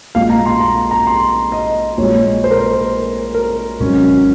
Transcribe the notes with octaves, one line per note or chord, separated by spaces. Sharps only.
A#1 A#2 G#3 F5
A#5
C6
A#5
A#5
C6
D#5
A#1 A#2 G#3 C#5
C5
A#4
C5
A#4
G#1 G#2 F#3 C#4